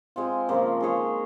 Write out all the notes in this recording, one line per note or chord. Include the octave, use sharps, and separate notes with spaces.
G#3 C4 F4
C#3 F3 A#3
G#3 D#4 G#4 C#5